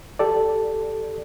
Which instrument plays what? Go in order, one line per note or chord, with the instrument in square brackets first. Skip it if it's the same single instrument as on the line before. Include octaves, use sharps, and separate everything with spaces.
[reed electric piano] G4 A4 D5